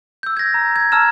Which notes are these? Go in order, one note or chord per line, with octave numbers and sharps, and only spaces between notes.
E6 G6
G#6 A#6
A#5
G#6
A5 A#5 E6 F6 E7